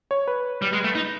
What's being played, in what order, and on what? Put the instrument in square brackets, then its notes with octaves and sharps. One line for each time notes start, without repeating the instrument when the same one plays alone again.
[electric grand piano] C#5
B4
[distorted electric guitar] G3
G#3
A3
D#4